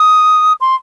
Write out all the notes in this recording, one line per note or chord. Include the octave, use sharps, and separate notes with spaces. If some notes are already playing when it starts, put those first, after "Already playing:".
Already playing: D#6
C6